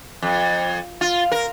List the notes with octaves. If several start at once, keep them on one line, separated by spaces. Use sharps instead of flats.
F2
F4
A#4